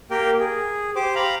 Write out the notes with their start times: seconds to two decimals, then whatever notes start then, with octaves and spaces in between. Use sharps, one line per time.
0.11 A#3 G4 A#4 G5
0.39 G#4
0.96 G4 C5 D6
1.16 F5 A#5 B5